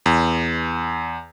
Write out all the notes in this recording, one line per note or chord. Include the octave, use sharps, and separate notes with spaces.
E2